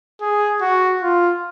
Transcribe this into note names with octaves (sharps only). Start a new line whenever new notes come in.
G#4
F#4
F4